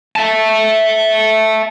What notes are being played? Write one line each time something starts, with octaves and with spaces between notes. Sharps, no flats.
E5 A5